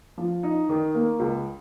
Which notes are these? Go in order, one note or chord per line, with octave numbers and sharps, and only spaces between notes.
F3
D#4
D#3
A#3
C#2